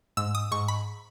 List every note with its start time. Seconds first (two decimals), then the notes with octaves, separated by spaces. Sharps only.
0.17 G#2 E6
0.35 D#6
0.51 G#2 C#6
0.68 B5